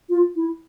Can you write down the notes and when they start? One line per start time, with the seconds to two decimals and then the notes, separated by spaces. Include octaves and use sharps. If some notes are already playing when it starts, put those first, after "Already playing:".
0.09 F4
0.36 E4